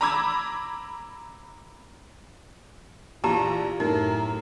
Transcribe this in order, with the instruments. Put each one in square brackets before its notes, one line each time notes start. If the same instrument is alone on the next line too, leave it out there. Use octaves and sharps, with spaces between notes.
[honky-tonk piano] A#5 B5 D6 E6 G#6
[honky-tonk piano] A#1 E3 [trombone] F4 [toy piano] G4 A5 A#5
[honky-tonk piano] F#2 [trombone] A2 [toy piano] D#4 [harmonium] A#4